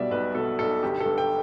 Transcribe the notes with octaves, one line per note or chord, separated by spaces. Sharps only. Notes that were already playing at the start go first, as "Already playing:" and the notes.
Already playing: B1 B2 G3 D5 E5
B1 B4
B2 A4
B1 A4
G1 G4
A4
G2
G5